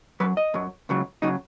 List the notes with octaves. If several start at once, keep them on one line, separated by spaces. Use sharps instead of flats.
F#2 F#3 B4
D#5
F#2 F#3
C#2 C#3 F#3
C#3 F#3 D#4